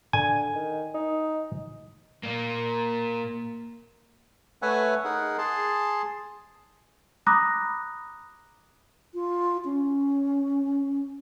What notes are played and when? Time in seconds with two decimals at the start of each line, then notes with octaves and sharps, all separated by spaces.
0.13 D3 G#5
0.55 D#3
0.94 D#4
2.23 A#2 A#3
4.62 A3 B4 C#5 E5 F#5 G#5
5.05 D#4 G#4 A#4 F#5
5.38 G#4 A5 C6
7.26 A#5 B5 D6 D#6 F#6 A#6
9.14 F4
9.65 C#4